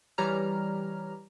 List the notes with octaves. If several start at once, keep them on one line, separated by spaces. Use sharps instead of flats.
E3 G3 G4 C#5 A#5 F6